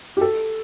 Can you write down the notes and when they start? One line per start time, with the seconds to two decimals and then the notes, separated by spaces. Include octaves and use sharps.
0.17 G4
0.21 A4